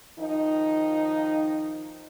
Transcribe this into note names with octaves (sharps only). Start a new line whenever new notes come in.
D#3 F3 D#4